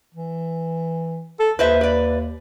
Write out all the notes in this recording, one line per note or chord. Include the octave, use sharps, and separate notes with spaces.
E3
A4
D#2 B4 C5 E5
B4 D5